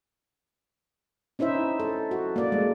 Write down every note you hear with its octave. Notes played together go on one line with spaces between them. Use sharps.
C#4 D#4 E4 C5 E5
A4
F#4
A#3 D5
G#3